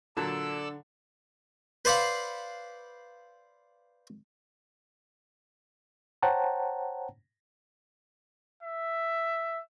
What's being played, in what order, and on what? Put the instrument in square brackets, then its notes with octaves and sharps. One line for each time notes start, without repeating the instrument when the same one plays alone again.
[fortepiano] A#2 F#3 A5 [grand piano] D3 [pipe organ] A4 D5 E6
[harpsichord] B4 C5 D5 F5 F#5 B5
[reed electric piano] C5 C#5 F#5 G5 A5 A#5
[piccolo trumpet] E5